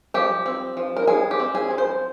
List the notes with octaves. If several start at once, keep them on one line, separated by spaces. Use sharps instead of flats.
F3 G4
C4
F3
A#4
F3 G#4
G4
C4
G#4
F3
C5